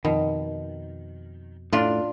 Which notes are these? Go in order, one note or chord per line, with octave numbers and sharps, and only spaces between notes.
F2 B2 D#3
A2 D4 F4